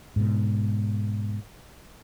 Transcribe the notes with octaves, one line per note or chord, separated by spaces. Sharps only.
G#2 B2